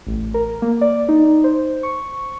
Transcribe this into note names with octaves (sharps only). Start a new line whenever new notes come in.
A1
A#4
A#3
D5
D#4
C5
C#6